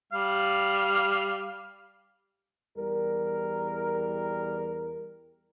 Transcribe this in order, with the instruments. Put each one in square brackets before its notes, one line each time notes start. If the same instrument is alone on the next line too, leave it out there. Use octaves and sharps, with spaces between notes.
[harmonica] G3 F5
[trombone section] E2 G3 A#4